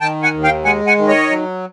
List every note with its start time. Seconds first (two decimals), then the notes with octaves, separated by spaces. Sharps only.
0.01 D#3 G5 A5
0.23 F#5 G#5
0.34 D#2
0.43 F5 G5
0.65 G#3 F#5 G#5
0.87 F#5 G#5
0.98 D#3
1.08 C#5 D#5
1.30 F#3